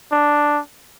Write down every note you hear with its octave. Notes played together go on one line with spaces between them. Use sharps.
D4